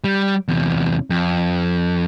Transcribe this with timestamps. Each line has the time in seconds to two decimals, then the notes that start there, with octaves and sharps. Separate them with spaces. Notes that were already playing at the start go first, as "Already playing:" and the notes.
0.04 G3
0.48 E2 C3
1.10 F2